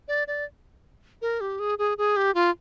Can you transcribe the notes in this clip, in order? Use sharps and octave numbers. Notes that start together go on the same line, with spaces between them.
D5
D5
A#4
G4
G#4
G#4
G#4
G4
F4